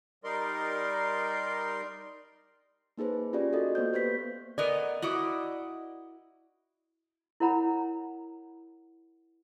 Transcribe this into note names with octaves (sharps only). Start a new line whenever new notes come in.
G3 D#4 A#4 D5 C6
A#3 D#4 G#4 B4 C5
C#4 F4 G4 G#4 D5
F#4 A4 D#5
A#3 B3 C5 G6
G4 B4 C5 G6 B6
A3 B3 A#4 D5 D#5 G#5 A#5
E4 F#4 D#5 F#5 D6
E4 A#4 C#5 F#5 A#5 B5